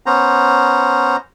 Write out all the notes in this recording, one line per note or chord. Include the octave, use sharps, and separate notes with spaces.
B3 C#4 C5 A#5